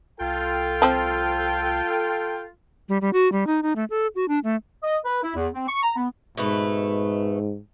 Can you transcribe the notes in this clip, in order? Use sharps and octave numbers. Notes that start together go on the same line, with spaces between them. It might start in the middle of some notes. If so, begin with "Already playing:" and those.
C2 F4 A4 G5
F3 C4 C5
G3
G3
F#4
G3
D#4
D#4
A3
A4
F#4
D4
A3
D#5
B4
E4
E2
C4
C#6
A#5
B3
G#2 B2 A3 B4